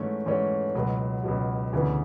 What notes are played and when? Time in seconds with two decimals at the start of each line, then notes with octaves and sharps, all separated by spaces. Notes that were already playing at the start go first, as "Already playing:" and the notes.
Already playing: G#2 E3 A3 C#4
0.26 G#2 E3 A3 C#4
0.75 C#2 B2 F#3
1.24 C#2 B2 F#3
1.73 D2 C#3 E3 B3